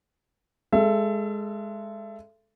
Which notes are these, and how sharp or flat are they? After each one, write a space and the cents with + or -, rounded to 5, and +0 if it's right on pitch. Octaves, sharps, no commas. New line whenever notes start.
G#3 +0 A4 +0 E5 +35